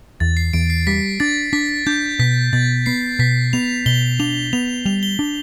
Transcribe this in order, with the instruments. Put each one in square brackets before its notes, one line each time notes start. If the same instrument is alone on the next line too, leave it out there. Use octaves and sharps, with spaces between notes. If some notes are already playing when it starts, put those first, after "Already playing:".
[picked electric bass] E2 [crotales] A6
[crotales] C7
[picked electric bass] E2 [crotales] D7
[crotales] C7
[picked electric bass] G3 [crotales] B6
[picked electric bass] D4 [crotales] A6
[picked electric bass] D4 [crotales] B6
[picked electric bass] D4 [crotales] G6
[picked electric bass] B2 [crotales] B6
[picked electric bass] B2 [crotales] A6
[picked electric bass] B3 [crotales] C7
[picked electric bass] B2 [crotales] B6
[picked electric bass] B3 [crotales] F7
[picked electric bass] B2 [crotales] G7
[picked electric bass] D4 [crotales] F7
[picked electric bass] B3 [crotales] F7
[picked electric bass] G3 [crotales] F7
[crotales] G7
[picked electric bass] D4